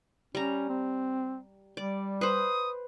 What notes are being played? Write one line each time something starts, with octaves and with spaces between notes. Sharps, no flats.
G3 C#4 A#5
C4
G3 D5
B4 C5 D#6